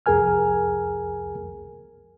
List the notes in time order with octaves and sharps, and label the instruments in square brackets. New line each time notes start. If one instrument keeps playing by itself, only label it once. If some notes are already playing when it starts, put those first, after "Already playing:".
[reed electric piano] C2 F2 G#4 A#4 G#5 F6